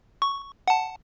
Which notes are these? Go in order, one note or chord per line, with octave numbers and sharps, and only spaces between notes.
C#6
F#5 A5